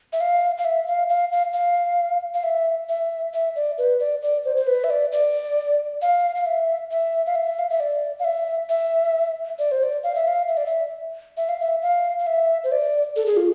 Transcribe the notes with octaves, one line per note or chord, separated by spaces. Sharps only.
E5
F5
F5
E5
F5
F5
F5
F5
F5
E5
E5
E5
D5
B4
D5
D5
C5
C5
B4
E5
D5
D5
F5
F5
E5
E5
F5
E5
F5
E5
D5
F5
E5
E5
D5
C5
D5
F5
E5
F5
E5
D5
E5
E5
F5
E5
F5
F5
E5
C5
D5
A4
G#4
F4